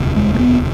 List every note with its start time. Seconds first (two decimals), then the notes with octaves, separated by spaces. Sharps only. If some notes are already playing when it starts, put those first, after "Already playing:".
Already playing: E1 D2 C3
0.16 G#3
0.34 A3
0.39 B3